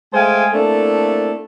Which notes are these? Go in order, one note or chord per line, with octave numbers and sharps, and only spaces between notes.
G#3 A3 C5 F5 G5 G#5
A3 A#3 C4 D4 E4 A4